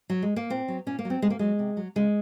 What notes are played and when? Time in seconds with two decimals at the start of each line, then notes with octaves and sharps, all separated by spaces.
0.10 F#3
0.22 G#3
0.36 A#3
0.50 A#2 C4
0.68 F#3
0.86 A#2 C#4
0.99 A#3
1.05 F#3
1.10 C4
1.22 C3 G#3
1.30 A#3
1.39 F#3 G#3
1.59 C3
1.77 F#3
1.96 C#3 G#3